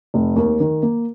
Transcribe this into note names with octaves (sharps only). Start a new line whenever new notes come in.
F1
D#2
D#3
A#3